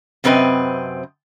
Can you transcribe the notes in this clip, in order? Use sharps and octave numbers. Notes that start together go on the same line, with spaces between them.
F#2 C3 C4 B4 D#5